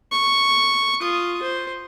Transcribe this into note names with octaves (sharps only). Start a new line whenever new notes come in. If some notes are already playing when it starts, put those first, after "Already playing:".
C#6
F4 D#6
C5